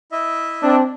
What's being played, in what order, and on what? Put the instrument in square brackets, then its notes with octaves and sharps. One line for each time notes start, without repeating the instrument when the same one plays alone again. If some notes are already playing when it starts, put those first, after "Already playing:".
[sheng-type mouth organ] E4 D#5 E5
[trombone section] C4 D4